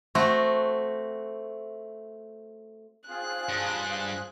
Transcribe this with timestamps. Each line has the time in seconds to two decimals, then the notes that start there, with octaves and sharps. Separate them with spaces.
0.15 A3 C4 F#4
3.09 C4 F4 G#4 F#6
3.49 G2